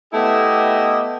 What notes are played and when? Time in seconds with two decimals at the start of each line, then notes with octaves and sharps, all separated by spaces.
0.13 A3 B3 E4 G4 D#5